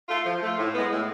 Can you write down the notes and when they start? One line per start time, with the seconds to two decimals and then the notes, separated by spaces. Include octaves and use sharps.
0.09 A3 F4
0.25 F3
0.41 A3 F4
0.58 A2
0.74 G#3 B3
0.91 A2